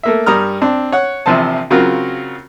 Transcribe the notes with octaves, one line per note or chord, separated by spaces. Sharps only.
A3 A#3 E5
G2 G3 A#4 A#5 D#6 F6
C4 D4
C#5 F#5
A#1 C3 E3 F3 C5 A5
C#3 F#3 C4 F4 F#4 A#4